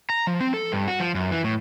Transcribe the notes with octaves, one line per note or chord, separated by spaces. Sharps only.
A#5
F3
C4
A4
G2
F#4
F3
F#2
E3
A2